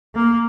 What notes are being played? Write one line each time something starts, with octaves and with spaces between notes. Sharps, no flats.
A#3